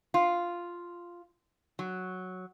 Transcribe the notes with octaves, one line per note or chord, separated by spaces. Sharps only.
F4
F#3